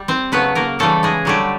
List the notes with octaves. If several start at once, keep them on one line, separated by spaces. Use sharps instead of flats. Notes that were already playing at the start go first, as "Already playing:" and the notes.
Already playing: G3
C4 C5
C#3 F#3 A3 B3 B4
A#3 A#4
C#3 E3 G3 A3 A4
G#3 G#4
D3 F#3 G3 A3 G4